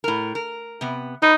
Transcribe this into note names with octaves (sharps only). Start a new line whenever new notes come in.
A2 A#4
A#4
C3 B3
D#4 B4